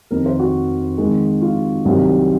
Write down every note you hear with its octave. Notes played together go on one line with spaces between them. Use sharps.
F1 F2 D#3 A#4
C5
F#4
F2 D#3 G#3
F4
C2 C3 D#3 F#3 C4